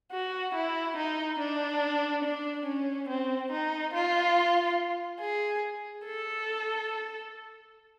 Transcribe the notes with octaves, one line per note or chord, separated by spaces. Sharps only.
F#4
E4
D#4
D4
D4
C#4
C4
D#4
F4
G#4
A4